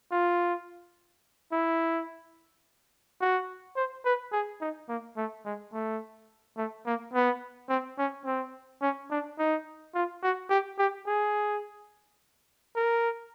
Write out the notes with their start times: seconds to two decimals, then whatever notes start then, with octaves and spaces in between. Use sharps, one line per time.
0.12 F4
1.52 E4
3.21 F#4
3.76 C5
4.05 B4
4.32 G#4
4.61 D#4
4.89 A#3
5.17 A3
5.45 G#3
5.73 A3
6.58 A3
6.86 A#3
7.14 B3
7.69 C4
7.98 C#4
8.25 C4
8.82 C#4
9.11 D4
9.39 D#4
9.95 F4
10.23 F#4
10.50 G4
10.79 G4
11.07 G#4
12.76 A#4